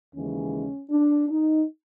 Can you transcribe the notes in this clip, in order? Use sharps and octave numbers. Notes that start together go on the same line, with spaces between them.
D#2 C#3 E3 G#3 C#4
D4
D#4